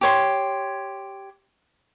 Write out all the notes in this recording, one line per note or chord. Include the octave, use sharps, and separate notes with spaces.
G4 C#5 C6